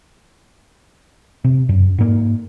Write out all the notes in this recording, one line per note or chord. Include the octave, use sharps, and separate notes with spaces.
C3
F#2
G#2 A#3